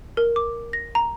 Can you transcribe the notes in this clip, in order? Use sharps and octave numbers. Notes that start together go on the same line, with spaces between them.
A#4
D6
A#6
A#5